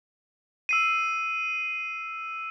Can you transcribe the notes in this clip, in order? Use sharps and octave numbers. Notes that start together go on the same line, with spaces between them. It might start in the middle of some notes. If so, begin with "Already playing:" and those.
E6 C7 D#7